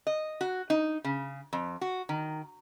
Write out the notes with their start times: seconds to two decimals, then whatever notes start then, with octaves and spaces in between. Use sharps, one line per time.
0.07 D#5
0.41 F#4
0.70 D#4
1.04 C#3
1.53 F2
1.81 F#4
2.09 D#3